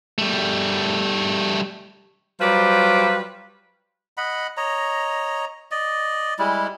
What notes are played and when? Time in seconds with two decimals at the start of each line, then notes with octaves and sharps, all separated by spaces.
0.18 G3 A3
2.41 F#3 G3 F4 B4 C5 D5
4.17 D#5 F#5 B5
4.57 C#5 D#5 A#5
5.71 D5 D#5
6.39 G3 G#3 E4